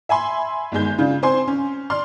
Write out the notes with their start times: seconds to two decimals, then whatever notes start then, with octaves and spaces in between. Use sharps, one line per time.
0.09 E5 G#5 B5 C6
0.72 G1 D#3 G#3 G6
0.98 C#3 D4 F4
1.22 C4 C5 G#5 C6
1.47 C#4
1.90 D5 C6 F6